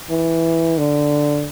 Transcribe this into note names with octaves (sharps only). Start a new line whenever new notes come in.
E3
D3